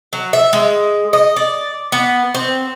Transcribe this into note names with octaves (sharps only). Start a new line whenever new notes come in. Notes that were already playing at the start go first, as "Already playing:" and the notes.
F#3
E5
G#3
D#5
D5
B3
C4